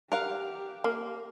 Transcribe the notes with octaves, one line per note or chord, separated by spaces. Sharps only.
G4 A#4 F5 F#5
A#3